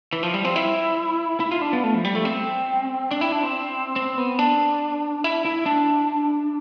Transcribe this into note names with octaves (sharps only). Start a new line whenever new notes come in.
E3
F3
G3
C4
E4
E4
F4
D4
B3
A3
F3
G3
A3
C4
D4
E4
D4
C4
C4
B3
D4
E4
E4
D4